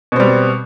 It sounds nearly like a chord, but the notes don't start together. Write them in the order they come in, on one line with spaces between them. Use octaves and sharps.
B2 C4 G3